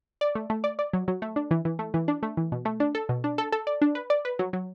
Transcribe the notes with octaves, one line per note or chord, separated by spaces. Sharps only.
D5
A3
A3
D5
D5
F#3
F#3
A3
D4
E3
E3
A3
E3
D4
A3
E3
B2
A3
D4
A4
B2
D4
A4
A4
D5
D4
B4
D5
B4
F#3
F#3